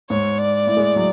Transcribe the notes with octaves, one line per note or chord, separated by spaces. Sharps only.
G#2 C#5
D5
A2
G#3
F#3